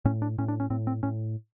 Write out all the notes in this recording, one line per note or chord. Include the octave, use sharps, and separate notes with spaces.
A2 C#4
D4
A2 C#4
D4
C#4
A2 C4
C4
A2 C#4